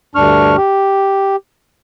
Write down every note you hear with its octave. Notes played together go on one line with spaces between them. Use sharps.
D2 G2 D4 C#6 F6
G4